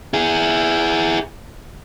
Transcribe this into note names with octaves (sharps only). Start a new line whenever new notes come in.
E4 G#4